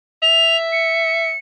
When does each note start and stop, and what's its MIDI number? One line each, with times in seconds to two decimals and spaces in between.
0.22 1.32 76
0.22 0.57 101
0.72 1.38 97